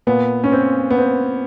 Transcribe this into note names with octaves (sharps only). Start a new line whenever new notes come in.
A#2 B3
C#4
C4
B3
C4